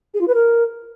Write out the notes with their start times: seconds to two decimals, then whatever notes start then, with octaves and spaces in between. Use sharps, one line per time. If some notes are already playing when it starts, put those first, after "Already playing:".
0.14 G#4
0.20 F4
0.27 B4
0.34 A#4